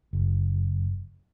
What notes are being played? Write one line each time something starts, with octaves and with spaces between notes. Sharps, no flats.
F#1